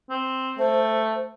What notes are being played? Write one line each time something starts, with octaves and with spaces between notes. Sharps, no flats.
C4
A3 C5